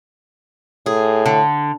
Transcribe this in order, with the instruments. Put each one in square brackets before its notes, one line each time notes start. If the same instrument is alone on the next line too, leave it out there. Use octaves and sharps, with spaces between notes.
[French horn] A2 [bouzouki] G#4
[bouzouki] D3